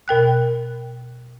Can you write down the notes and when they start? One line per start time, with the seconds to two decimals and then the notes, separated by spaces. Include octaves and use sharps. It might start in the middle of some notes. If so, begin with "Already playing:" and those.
0.08 B2 A#4 G5 F#6